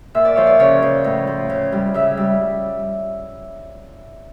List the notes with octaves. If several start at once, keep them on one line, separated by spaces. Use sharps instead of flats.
A#2 E5
D5
F3 C#5
D5
C#3 C#5
F3
A2
F3
C#3
G3
C#3 E5
G3